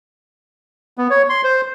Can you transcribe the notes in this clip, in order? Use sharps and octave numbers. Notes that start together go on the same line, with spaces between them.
B3
C#5
C6
C5